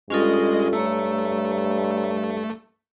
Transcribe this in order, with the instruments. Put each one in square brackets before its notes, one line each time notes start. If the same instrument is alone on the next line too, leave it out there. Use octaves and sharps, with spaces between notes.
[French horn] G2 [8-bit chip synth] G#3 D#5 [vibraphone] C#4 F4 A4
[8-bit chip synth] A3 [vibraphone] C#5 A#5 E6